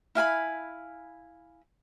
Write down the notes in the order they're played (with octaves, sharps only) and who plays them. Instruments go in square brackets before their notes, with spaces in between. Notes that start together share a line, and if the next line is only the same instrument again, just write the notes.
[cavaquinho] E4 F5 G#5 B5